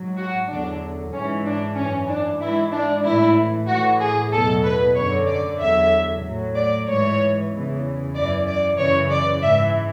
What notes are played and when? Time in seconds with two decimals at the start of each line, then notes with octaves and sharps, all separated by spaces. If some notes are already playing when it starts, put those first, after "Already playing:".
Already playing: G#2 F#3
0.17 F#4
0.48 E2 D3 F#3 D4
1.12 G#2 E3 C#4
1.45 D4
1.76 F#2 E3 C#4
2.08 D4
2.40 G#2 E3 E4
2.72 D4
3.04 A2 E3 E4
3.67 A2 E3 F#4
3.99 G#4
4.32 E2 B2 F#3 A4
4.64 B4
4.95 F#2 D3 F#3 C#5
5.27 D5
5.59 E2 D3 F#3 E5
6.23 A2 F#3
6.55 D5
6.87 G#2 E3 C#5
7.51 E2 C#3 E3
8.14 F#2 E3 D5
8.47 D5
8.78 F#2 C#3 E3 C#5
9.11 D5
9.41 G#2 E3 E5